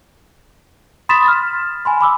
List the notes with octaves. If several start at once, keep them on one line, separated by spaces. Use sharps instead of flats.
B5 C6 D#6 A6 B6 E7
F6
G#5 B5 C6
B5 D6 E6